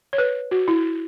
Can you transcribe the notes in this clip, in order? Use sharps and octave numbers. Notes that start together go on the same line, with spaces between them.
C#5
B4
F#4
E4